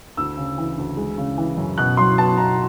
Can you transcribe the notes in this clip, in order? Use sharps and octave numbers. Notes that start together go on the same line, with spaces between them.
D2 E6
C#3
E3
D2
G#3
C#3
E3
F#2
B2 F#6
F#3 C6
B3 A5
B2 A#5